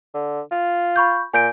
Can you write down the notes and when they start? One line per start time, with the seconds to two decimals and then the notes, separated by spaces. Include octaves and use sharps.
0.15 D3
0.52 F4
0.96 B5 C#6 G6
1.34 A#2 G#5 G6 D7